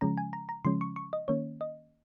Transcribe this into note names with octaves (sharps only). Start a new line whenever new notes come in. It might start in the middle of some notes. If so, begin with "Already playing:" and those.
C#3 F3 G#3 C#4 A#5
G#5
A#5
A#5
C#3 F3 G#3 C#4 C6
C#6
C#6
D#5
D#3 A#3 C#4 C#5
D#5